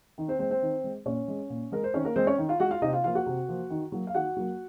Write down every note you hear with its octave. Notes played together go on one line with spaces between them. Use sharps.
D#3
C4 C5
G#3 C4 C5
C4 C5
D#3
G#3
A#2 C#4 C#5
G#3
A#2
G#3 A#4
C5
D#3 C#4 C#5
A#3 A#4
G#3 C4 C5
C#4 C#5
D#3
F4 F5
G#3 F#4 F#5
F4 F5
C3 D#4 D#5
F4 F5
F3 A#3 F4 F5
F#4 F#5
C3
F3 A#3
D#3
F#3 A#3
F5
D#3 F#4 F#5
F#3 A#3